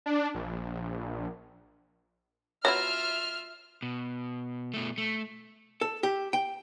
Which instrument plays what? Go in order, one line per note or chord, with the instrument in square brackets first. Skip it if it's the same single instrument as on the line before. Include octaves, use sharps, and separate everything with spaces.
[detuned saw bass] D4
A#1
[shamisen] F#3 B3 E4 [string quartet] F4 E5 [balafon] C#5 [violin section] F6
[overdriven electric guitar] B2
B2 A3
A3
[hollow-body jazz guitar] A4
G4
G5